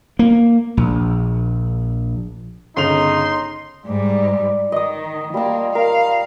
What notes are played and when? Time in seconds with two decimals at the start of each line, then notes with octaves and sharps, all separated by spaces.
0.19 A#3
0.77 A#1
2.77 G1 C#3 D#4 C6 F7
3.86 G#2 G3 D5
4.72 D#3 D#5 D#6
5.34 G3 A#3 F4 A5
5.75 A#4 F5